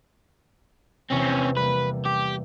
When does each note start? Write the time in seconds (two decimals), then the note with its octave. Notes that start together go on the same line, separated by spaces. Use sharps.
1.11 E2 C3 C4 C#4
1.57 G3 A#3 B4
2.06 G4